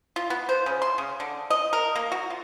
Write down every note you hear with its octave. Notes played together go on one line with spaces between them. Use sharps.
F4
B3
C5
C#3
C6
C#3
D3
D#5
A#4
A#3
F#4
F4